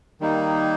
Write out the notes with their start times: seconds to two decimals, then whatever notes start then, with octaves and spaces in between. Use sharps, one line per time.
0.21 D#3 G3 A#3 D#4